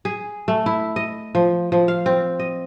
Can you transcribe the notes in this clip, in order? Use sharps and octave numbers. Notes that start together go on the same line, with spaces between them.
G#4
A3
E4
D#5
F3
F3
F5
C4
D#5